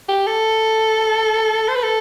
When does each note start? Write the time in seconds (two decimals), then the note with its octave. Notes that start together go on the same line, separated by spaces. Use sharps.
0.09 G4
0.27 A4
1.68 C5
1.76 B4
1.83 A4